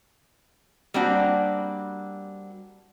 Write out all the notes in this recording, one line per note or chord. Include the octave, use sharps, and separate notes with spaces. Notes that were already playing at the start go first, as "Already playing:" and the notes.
G3 A#3 C4 D4 F#4